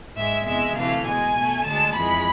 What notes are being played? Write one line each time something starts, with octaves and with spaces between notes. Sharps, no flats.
G#2 G#3 E5
E2 C3 G#3 E5
D2 C3 E3 A3 F5
B2 G#3 G#5
B2 A3
D2 D3 G#3 A5
F2 E3 G#3 B5